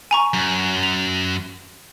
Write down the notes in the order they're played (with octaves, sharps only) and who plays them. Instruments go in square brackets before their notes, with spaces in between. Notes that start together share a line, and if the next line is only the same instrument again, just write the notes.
[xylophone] G#5 A#5 C#6
[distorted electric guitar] F#2
[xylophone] F7